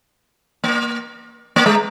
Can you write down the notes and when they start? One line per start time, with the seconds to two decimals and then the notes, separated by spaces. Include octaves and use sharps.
0.64 A#3
1.56 A#3
1.66 G#3